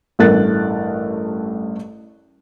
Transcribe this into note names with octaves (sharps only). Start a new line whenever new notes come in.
A1 G2 A3 A#4 F#6 A6